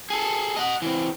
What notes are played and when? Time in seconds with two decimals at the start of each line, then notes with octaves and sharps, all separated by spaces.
0.10 G#4 A4
0.56 D#5 F#5
0.82 E3 C4